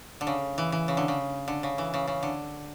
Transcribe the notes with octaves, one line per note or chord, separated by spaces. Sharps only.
D3
C#3
E3
E3
C#3
D3
C#3
D3
C#3
E3
C#3
C#3
D3